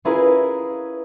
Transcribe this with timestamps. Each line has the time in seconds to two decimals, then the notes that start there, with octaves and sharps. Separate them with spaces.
0.05 C#4 E4 F4 G#4 A#4 B4